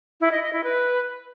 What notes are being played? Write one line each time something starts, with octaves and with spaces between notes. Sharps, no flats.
E4
D#5
D#5
E4
B4